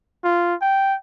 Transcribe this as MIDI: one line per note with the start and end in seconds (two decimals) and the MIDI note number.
0.24 0.55 65
0.61 0.95 79